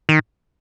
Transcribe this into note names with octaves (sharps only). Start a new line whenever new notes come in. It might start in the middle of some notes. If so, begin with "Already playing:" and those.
D#3